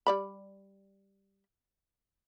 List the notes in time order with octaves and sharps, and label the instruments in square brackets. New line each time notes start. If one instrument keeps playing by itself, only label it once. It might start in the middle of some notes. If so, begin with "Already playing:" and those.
[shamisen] G3 D5 B5